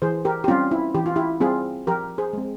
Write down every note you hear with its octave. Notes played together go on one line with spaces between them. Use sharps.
E3 G#4 C5
G4 A#4
G4
G3 C4 C#4 F4
E4
E3 G4
F4
E4 G4
G3 C4 F4 G#4
F3 G4 A#4
G#4 C5
G#3 C4